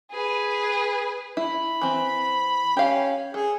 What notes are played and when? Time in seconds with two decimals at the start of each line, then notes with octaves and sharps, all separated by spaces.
0.12 G#4 B4
1.37 E4 B5
1.82 E3 C4
2.77 C#4 G4 F5
3.34 G#4 A4